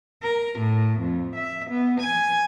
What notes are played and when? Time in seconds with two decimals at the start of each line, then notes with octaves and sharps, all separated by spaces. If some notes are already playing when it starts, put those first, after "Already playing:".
0.24 A#4
0.58 A2
1.00 F2
1.35 E5
1.70 B3
2.00 G#5